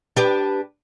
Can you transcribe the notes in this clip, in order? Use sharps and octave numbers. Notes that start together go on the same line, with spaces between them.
D4 G4 B4